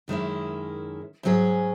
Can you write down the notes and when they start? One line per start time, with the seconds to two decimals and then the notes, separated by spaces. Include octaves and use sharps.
0.08 F#2 D#3 G#3 C#4 E4
1.23 G#2 F#3 C#4 G#4